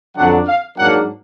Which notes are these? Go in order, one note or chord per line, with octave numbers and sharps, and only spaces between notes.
F2 D3 F#3 D4 F#5
F5
G#2 F#3 A#3 D4 F#5